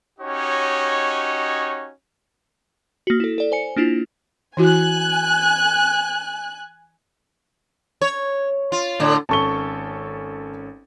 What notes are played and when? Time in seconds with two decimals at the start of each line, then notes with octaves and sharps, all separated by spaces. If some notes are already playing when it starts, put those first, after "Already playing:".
0.20 C#4 D#4 F#4 G4 C#5 D#5
3.07 A#3 F#4
3.20 E4 A4
3.38 A4 D5
3.52 C5 G#5 C#7
3.76 A#3 D4 E4 F4
4.57 E3 E4 F#4 G#5 F#6
8.02 C#5
8.72 F4
9.00 A2 D3
9.29 G#1 C#4 A4 A5 C#6 G7